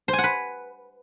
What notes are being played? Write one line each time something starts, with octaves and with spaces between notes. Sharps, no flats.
C5
G#5
F#5
B4